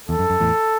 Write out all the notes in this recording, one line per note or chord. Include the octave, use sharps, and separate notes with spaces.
E2 A4
F#2
F#2
E2 A2